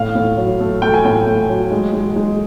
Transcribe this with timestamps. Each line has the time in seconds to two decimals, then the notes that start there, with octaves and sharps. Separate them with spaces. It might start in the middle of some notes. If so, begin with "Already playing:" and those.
Already playing: A2 F5
0.15 A2
0.37 F#3
0.60 A3
0.82 A3 G5
0.94 G#5
1.05 A2 G5
1.27 A3
1.49 F#3
1.71 G#3
1.93 G#3
2.16 G#3